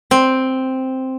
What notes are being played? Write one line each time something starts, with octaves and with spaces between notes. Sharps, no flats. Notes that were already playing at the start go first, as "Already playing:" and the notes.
C4